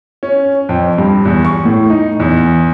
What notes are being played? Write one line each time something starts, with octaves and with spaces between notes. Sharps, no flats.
C#4
F2
G2
E2
C#6
A2
D#4
E2